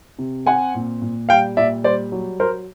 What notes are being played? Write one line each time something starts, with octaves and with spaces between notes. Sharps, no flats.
C3
C4 F#5 G#5
A#2
A#2
G3 F5 G5
A#2 D5 E5
G3 C5 D5
F#3
F#3 A#4 C5